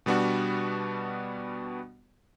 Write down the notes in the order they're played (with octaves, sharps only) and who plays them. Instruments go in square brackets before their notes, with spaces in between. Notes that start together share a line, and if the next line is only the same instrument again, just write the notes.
[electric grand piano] B2 G3 B3 D4 F#4